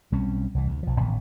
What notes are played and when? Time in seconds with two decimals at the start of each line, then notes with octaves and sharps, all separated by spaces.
0.12 B1 G3 C4 C#4
0.55 C2 E3
0.68 D2
0.83 B1 F3
1.00 A1 A2 D#3 B3